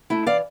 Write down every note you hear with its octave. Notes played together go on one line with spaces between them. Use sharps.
A3 E4
E3 D5 F5